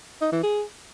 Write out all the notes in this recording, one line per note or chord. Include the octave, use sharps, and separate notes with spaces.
D#4
E3
G#4